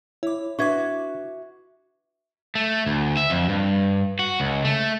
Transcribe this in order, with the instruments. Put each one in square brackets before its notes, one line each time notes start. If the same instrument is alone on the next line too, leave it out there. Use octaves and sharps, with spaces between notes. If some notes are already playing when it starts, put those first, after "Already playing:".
[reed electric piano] E4 [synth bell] C#5 D6
[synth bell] D4 B4 D6 [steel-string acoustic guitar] F#4 E5 [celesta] C#6 G#6
[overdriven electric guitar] A3
D2
E5
F2
G2
F#4
C#2
A3